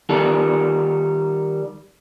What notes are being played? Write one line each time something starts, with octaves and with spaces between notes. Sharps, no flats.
D#3 G3 A4